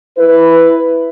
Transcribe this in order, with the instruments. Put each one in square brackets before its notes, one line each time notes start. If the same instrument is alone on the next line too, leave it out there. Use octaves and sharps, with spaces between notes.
[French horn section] E4 B4